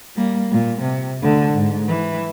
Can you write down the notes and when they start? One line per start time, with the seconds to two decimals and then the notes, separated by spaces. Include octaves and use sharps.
0.16 G3 A#3
0.51 A#2
0.82 C3
1.21 D2 D3
1.53 G#2
1.88 E3